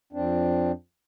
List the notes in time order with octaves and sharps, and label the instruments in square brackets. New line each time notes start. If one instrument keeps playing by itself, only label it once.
[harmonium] F2 C4 D4